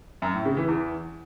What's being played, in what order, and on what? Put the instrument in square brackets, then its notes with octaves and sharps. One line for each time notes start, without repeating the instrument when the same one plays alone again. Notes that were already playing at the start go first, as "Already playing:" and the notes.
[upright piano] F#2
A2
C#3
E3
E2